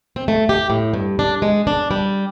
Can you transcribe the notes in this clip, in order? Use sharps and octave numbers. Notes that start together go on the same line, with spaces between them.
C4
A3
G4
A2
G2
D4
G#3
D4
G3